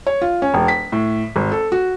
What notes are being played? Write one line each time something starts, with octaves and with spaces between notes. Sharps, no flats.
C#5
F4
C#4
E1
B6
A2
G#1
A4
F#4